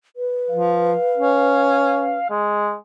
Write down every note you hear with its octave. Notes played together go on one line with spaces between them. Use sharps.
B4
F3 F5
C#4
G#3